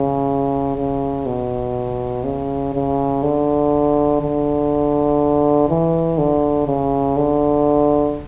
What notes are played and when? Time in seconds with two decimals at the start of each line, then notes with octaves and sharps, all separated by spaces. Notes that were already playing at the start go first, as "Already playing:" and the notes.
Already playing: C#3
0.76 C#3
1.26 B2
2.24 C#3
2.74 C#3
3.23 D3
4.22 D3
5.69 E3
6.18 D3
6.67 C#3
7.17 D3